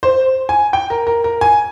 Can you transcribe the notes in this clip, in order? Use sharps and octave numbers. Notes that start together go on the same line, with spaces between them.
C5
G#5
G5
A#4
A#4
A#4
G#5